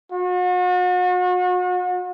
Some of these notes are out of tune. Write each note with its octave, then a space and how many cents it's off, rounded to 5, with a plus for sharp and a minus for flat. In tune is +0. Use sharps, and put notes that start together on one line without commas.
F#4 -40